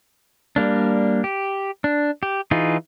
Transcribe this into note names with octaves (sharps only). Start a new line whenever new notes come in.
G3 A#3 D4
G4
D4
G4
E3 D#4 F4 G#4